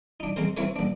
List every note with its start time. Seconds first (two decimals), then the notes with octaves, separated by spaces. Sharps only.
0.20 D4 D#4
0.36 G#3 C4 A#4 C5
0.57 C4 E4 A#4 B4 C#5
0.76 A#1 D4